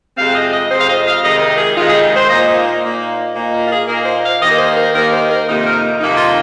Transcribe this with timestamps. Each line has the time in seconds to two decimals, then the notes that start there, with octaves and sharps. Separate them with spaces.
0.17 F2 C3 G#3 C4 F5
0.34 D#5
0.52 D#5
0.69 F2 C3 G#3 C4 C5
0.79 F5
0.88 D#5
1.06 F5
1.23 F2 C3 D#3 G#3 D#4 D#5
1.40 A#4
1.58 G#4
1.76 F2 C3 D#3 G#3 D#4 F4
1.89 G#4
2.16 C5
2.29 A#2 A#3 D#4 D#5
2.42 C5
2.82 A#2 A#3 D#4
3.35 A#2 A#3 D#4
3.53 A#4
3.65 F4
3.71 G#4
3.88 A#2 A#3 D#4 A#4
4.05 C5
4.23 F5
4.41 D#2 D#3 A#3 D#4 D#5
4.52 A#4
4.58 C5
4.76 A#4
4.93 D#2 D#3 A#3 D#4 A#4
5.11 C5
5.29 A#4
5.47 F2 C3 D#3 A#3 D#4
5.64 A#4
6.00 F2 C3 D#3 A#3 D#4
6.17 F4